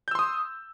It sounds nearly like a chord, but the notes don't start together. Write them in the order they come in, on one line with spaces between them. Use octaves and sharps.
G6 E6 C6 D#6